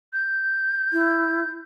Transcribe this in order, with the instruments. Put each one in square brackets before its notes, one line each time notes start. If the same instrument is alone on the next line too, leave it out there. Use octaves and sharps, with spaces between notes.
[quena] G6
[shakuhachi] E4